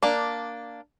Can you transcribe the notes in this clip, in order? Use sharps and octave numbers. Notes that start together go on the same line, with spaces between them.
A#3 D4